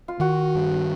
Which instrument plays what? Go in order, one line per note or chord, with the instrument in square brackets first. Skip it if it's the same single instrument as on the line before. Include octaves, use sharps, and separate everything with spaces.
[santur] F4
[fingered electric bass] D#3 [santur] F#4
[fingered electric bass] G2